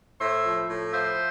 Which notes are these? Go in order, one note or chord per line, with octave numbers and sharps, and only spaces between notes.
A2 C5 E5
F3
A2
F3 C5 E5